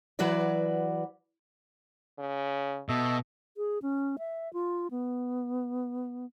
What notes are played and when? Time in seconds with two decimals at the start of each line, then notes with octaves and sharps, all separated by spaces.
0.19 E3 F#3 F#4 B4 D5
2.19 C#3
2.89 B2 A4 D#5 E5
3.57 G#4
3.82 C#4
4.19 E5
4.53 F4
4.91 B3